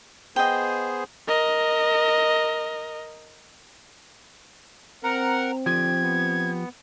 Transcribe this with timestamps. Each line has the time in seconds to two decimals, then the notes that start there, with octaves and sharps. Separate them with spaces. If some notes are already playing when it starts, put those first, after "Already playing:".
0.36 B3 G#4 C5 D#5 G5
1.28 A#4 D#5
5.04 C4 A#4 F#5 A#5
5.66 D3 F3 G4 G#6
6.01 B3